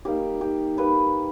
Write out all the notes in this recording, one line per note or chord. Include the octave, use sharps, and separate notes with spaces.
G3 A#3 D#4 G4
G4
G3 A#3 D#4 B4